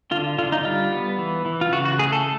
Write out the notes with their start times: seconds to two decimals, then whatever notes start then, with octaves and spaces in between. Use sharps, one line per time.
0.11 D3 F4
0.39 D3 F4
0.52 D#4
0.65 G3 F4
0.92 B3
1.18 E3
1.45 E3
1.61 F4
1.72 C#3 F#4
1.85 F#4
1.98 A3 G#4
2.12 A4